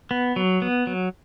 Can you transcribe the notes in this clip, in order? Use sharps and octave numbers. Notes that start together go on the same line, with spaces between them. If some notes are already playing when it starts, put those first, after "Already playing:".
B3
F#3
B3
F#3